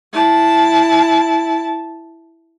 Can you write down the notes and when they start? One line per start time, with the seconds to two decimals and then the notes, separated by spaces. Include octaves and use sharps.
0.13 E4 A5